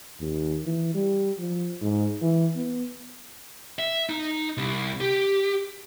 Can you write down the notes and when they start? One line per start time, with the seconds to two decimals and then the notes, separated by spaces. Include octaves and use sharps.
0.21 D#2
0.65 E3
0.95 G3
1.39 F3
1.82 G#2
2.22 E3
2.56 B3
3.79 E5
4.10 D#4
4.57 C2
5.00 G4